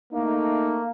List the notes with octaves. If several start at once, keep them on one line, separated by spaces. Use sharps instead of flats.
A3 A#3 D#4